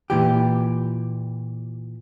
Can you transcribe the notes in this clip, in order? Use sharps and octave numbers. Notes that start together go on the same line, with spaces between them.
A#2 E3 G4